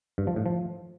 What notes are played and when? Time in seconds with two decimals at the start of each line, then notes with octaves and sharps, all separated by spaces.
0.18 G2
0.27 F3
0.36 A2
0.46 F3